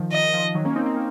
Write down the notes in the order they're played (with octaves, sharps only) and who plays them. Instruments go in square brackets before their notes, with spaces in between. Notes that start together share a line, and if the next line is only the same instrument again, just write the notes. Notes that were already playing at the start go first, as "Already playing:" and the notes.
Already playing: [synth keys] D#3 F3
[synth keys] D#3 [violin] D#5
[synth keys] F3
D#3 F#3
A#3 C#4
C4 D#4
C4
A#3